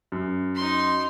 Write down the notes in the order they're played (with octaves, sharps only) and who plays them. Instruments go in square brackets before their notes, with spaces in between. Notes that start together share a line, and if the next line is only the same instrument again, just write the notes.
[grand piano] F#2
[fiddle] D#4 C6